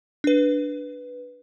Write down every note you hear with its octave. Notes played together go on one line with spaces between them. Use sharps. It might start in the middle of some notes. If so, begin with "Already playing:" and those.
D4 B4